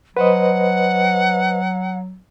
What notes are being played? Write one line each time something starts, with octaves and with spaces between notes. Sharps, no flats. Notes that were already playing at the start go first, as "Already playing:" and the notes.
F#3 B4 C5 D#5 F#5